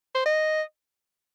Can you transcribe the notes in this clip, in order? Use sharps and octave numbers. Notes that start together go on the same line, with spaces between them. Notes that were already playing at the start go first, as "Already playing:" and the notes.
C5
D#5